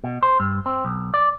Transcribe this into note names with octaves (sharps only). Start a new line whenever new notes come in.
B2
C5
G2
C4
B1
D5